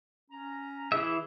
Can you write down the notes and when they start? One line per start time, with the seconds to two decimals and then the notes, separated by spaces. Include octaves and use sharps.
0.31 C#4 A#5
0.92 E3 G#4 E5